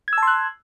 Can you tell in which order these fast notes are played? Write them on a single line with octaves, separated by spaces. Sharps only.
G#6 E6 A5 C6 F#6